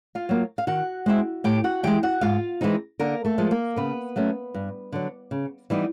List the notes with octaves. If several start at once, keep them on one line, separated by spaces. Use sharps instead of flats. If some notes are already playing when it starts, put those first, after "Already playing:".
F4 F5
F#3 A#3
F5
D#3 F#4 F#5
G#3 C4 E4
A2 G4 G5
F#4 F#5
E3 G#3 G4 G5
F#4 F#5
G#2 F4 F5
E3 G#3 C4 D#4
D3 A#3 A#4
A3 A4
F3 G#3
A#3 A#4
C#3 B3 B4
F#3 A3 C#4
G2
D3 F#3
C#3
E3 G3 B3 D#4